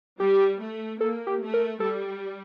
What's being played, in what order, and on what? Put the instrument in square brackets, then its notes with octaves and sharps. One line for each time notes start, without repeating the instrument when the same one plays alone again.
[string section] G3 [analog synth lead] G4
[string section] A3
[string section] A#3 [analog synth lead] A4
[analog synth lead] G4
[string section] A3
[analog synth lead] A#4
[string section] G3 [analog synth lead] A4